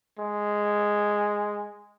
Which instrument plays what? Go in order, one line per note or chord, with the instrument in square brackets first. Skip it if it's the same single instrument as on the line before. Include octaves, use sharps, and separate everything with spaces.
[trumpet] G#3